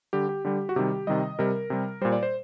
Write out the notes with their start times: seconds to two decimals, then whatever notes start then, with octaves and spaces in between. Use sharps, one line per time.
0.13 D3 G3 G4
0.29 G4
0.45 D3 G3 G4
0.69 F#4
0.76 C3 D#3 G3 G4
1.07 C3 D#3 G3 D#5
1.39 C3 G3 A#4
1.70 C3 G3
2.01 A#2 G3 C5
2.12 D5
2.23 C5